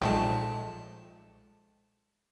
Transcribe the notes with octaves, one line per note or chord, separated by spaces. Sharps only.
B1 A#2 F3 G#3 A3 G4 A5